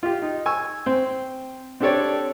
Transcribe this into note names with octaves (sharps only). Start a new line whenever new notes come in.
F4 G4
D#4
G#5 C#6 E6
C4 C5
C4 D4 G4 A4 C#5 D5